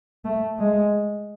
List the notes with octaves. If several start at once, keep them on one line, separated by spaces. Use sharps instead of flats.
A3
G#3